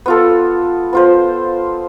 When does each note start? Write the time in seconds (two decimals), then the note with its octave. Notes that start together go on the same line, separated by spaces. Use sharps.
0.06 B3 F4 A4
0.93 B3 F4 C5